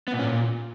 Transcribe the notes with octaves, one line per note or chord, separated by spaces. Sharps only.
B3
A#2
C#4
A#2